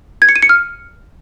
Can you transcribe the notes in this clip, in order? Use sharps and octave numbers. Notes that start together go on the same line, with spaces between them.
G#6
C#7
D#7
C#7
F6